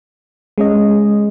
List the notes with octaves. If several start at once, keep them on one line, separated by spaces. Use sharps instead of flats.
G#3 C#4 D#5